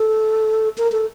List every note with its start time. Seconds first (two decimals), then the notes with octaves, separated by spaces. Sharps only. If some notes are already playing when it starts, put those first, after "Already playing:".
Already playing: A4
0.78 A#4
0.92 A4